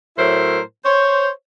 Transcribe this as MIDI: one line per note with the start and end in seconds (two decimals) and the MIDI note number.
0.18 0.60 45
0.18 0.60 54
0.18 0.60 64
0.18 0.60 70
0.18 0.60 72
0.85 1.29 72
0.85 1.29 73